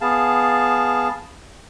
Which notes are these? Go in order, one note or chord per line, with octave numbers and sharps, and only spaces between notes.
B3 G#4 F5 A5